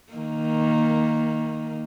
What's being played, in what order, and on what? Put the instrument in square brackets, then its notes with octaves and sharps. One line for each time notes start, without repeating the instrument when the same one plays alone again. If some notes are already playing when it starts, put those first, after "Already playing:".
[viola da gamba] D#3 A#3